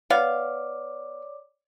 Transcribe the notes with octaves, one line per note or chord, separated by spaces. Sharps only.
B3 C#5 D5 F5 D6